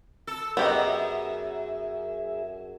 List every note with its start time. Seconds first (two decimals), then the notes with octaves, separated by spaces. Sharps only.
0.27 A4
0.57 F#2 B3 G4 G#4 D#5 E5